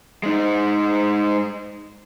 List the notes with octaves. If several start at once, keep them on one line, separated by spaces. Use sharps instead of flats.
G#3 D#4